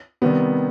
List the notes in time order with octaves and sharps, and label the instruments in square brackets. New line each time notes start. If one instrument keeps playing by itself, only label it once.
[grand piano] C3 D#3 G3 B3